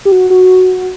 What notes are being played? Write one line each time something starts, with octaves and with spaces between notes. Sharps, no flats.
G4
F#4
F#4